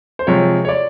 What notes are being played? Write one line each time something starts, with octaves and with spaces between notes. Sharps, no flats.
C5
C3 F3 G#3 C#5
C#5
D5